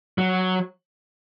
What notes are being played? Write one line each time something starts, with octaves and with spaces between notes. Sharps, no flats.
F#3